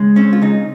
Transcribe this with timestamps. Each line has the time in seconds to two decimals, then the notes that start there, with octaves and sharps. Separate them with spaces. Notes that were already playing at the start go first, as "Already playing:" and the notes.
Already playing: C#3 G#3
0.16 C4 C#4
0.33 F4
0.41 C#3 D#4